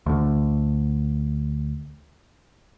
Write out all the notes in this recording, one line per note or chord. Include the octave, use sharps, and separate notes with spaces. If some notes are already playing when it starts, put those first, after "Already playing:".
D2 D3